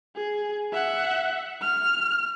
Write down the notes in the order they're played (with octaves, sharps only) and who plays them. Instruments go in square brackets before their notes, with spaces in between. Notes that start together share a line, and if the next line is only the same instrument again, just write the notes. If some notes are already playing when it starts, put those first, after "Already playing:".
[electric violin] G#4
E5 F#5
F6